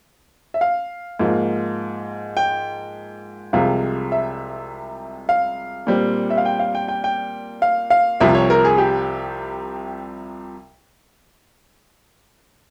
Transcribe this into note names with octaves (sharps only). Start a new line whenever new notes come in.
E5
F5
G#2 F3 A#3
G5
C2 C3 F3 G#3 F5
E5
F5
A#2 G3 C4
E5
F5
G5
F5
G5
G5
G5
F5
F5
C2 C3 F3 E5
C#5
A#4
G#4
G4